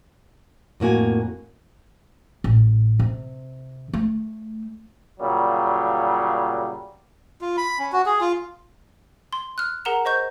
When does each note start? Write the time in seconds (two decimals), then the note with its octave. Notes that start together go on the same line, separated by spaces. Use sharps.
0.80 F2 A2 A#3 F#4 G#5
2.44 A1
2.99 C3
3.94 A3
5.20 A#2 C#3 F#3 G3
7.41 F4
7.57 B5
7.79 C#4
7.92 F#4
8.06 G#4
8.21 F4
9.33 C6
9.58 F6 F#6
9.85 G#4 A#4 F#5 A#5 E7
10.05 C5 D#5 C#6 G6